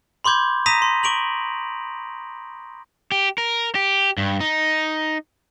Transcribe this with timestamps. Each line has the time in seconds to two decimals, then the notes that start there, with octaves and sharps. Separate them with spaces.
0.24 B5 C6 D6 G6 G#6
0.66 A#5 D#6 A#6 B6 D#7 F7
0.82 C6
1.03 C#6 D7 F7 F#7
3.12 G4
3.38 A#4
3.75 G4
4.18 G2
4.40 D#4